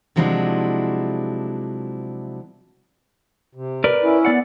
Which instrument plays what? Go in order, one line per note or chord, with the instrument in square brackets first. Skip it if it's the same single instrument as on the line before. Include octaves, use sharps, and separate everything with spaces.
[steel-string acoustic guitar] C3 F3 F#3 G#3 D4 E4
[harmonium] C3
[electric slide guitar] A#4 B4 D5
[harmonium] C#4 E4
[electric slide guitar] B3 D5 F#5